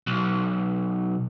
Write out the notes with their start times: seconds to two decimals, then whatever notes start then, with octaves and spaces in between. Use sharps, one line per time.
0.07 B1